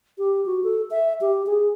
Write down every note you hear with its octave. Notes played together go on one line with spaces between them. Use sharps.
G4
F#4
A4
E5
G4
G#4